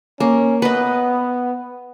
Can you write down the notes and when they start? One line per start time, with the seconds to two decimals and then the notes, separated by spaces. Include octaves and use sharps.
0.20 A#3 C#4
0.62 B3 B4 D#5